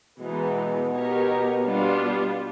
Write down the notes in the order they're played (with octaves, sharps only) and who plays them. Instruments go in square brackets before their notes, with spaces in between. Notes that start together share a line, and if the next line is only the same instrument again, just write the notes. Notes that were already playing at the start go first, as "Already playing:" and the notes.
[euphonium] B2 [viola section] E3 G#3 B3 D#4
[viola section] B3 D#4 G4 A#4 C#5
G3 B3 D4 F4